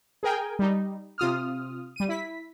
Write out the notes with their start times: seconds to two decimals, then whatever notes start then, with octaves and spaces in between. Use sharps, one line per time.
0.23 G#4 A#4 G5 G#5
0.59 G3 D#4
1.18 C3 F4 D#6 F6
1.96 G3 D#7
2.09 E4 B6